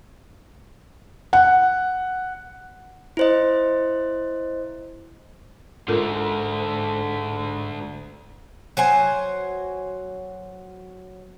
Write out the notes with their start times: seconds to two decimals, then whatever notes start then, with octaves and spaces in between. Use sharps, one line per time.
1.33 F#5
3.17 E4 C5 D#5
5.88 G#2 D3 A3 F4 A4 A#4
8.77 F#3 C5 G#5